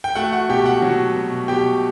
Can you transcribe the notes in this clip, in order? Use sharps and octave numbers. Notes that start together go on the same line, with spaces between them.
G5
A3 F#4 F#5
F#4 F#5
B2 G4 G5
F#4 F#5
F#3
B2
B2 G4 G5